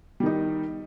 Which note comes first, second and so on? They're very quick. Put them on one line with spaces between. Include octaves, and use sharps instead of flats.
G3 D#3 D#4